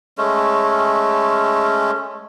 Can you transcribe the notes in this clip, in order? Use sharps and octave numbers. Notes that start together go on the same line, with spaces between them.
G#3 A3 C#4